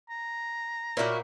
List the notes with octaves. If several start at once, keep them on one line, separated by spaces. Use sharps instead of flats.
A#5
A#2 A#3 E4 F#4 C#5 D5 G5